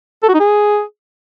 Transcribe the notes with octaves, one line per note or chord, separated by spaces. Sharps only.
A4
F#4
D#4
G#4